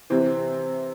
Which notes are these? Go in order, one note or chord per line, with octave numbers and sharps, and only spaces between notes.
C3 E3 C4